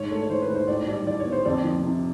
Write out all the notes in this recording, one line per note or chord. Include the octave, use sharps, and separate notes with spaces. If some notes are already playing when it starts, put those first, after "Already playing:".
Already playing: G#2 C#5
A3
C#5
E3 C5
B4
G#2
C5
A2 D5
G3 D5
E3 D5
C#5
B3
C5
F2 D5
F3
C3